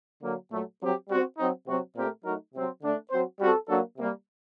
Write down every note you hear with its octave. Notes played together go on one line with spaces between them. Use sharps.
D3 F#3 A#3
A#2 F#3 A3
F#3 C4 G4
G3 C4 F#4 C5
F#3 C4 D#4
C3 F#3 C4 F#4
A#2 A3 C4 G4 A#4
F#3 A3 D#4 F#4 A#4
C3 F#3 C4
D3 A3 D4
F#3 C4 F#4 C5
G3 C4 F#4 A4
F#3 A#3 D4 F#4 A4
C3 G3 A#3